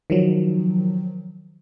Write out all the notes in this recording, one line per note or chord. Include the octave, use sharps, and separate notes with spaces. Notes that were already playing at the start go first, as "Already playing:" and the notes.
D#3 F3 F#3